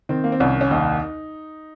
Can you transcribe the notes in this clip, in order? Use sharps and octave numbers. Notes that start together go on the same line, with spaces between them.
D#3 C4
A#3
C4
C2 C#4
C#4
D#2 D#4